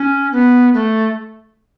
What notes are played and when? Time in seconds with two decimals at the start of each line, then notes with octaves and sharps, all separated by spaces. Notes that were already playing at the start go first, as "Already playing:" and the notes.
Already playing: C#4
0.32 B3
0.74 A3